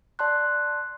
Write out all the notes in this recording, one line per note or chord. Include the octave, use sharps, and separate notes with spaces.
D5 A5 C6 F#6